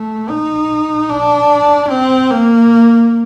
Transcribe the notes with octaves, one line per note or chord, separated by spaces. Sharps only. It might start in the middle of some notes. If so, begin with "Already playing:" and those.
Already playing: A3
D#4
D4
C4
A#3